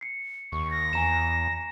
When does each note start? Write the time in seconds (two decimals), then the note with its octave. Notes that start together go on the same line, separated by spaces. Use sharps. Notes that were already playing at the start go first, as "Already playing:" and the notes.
0.01 C7 C#7
0.52 D#2 C#6
0.71 A#6
0.93 E2 G#5 A#5 E7